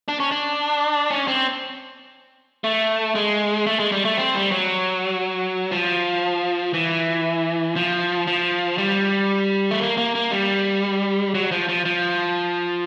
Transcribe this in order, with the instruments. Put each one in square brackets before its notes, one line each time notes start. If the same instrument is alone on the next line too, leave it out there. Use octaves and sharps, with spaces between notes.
[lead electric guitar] D4
C#4
D4
C#4
C4
A3
G#3
A3
G#3
G3
A3
C4
G3
F#3
F3
E3
F3
F3
G3
A3
A#3
A#3
A#3
G3
F#3
F3
F3
F3